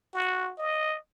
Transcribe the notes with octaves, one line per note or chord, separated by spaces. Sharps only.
F#4
D#5